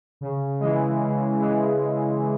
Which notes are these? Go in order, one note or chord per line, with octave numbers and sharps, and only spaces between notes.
C#3
E3 G#3
C#3
E3 G#3